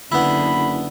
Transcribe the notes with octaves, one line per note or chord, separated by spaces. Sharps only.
F#1 D3 B3 E4 B5